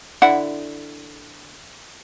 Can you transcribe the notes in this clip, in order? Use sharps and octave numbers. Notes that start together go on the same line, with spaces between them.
D3 E4 F#5